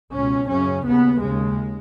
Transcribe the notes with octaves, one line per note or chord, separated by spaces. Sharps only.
C#2 B2 C#4
F#2 C#3 C#4
D#2 C#3 B3
D#2 C#3 G#3